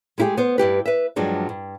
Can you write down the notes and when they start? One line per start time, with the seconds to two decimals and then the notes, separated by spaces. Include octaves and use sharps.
0.18 G#3 A3 E4 F4 G4 G#4
0.37 B3 C5
0.58 G2 E4 G4 B4
0.86 B4 E5
1.16 G2 F3 F#3 G#3 D4
1.49 G2